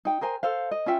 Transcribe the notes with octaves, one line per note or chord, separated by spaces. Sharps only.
D#4 G5
G#4 A#4 C5 G#5
A4 C5 F5
D#5
C#4 F4 E5 G5